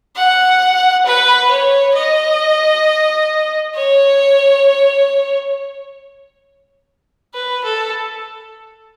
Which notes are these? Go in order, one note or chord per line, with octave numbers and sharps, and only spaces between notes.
F#5
B4
C#5
D#5
C#5
B4
A4